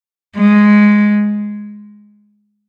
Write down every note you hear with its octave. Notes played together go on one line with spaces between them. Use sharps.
G#3